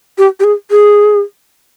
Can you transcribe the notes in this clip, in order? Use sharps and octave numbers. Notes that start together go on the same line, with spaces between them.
G4
G4
G#4
G#4